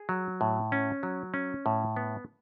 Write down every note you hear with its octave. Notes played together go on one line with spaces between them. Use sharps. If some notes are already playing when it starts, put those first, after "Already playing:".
Already playing: G#4
F#3
A2
C#4
F#3
C#4
A2
B3